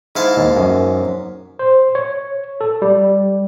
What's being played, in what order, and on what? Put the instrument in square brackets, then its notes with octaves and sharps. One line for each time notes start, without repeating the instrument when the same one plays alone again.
[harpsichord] G#2 F5 A5 [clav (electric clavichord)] E4
[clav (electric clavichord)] D#2
F#2
[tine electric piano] C5
C#5
A4
G3